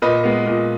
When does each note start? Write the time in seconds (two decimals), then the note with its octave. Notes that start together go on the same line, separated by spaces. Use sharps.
0.02 A#2 B4 D#5
0.24 G#3 B3
0.46 A#2